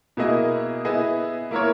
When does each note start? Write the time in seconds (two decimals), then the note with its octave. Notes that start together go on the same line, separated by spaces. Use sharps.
0.17 B2 A#3 E4 G#4 D#5
0.85 B3 E4 G#4 D#5
1.51 A#3 E4 A#4 C#5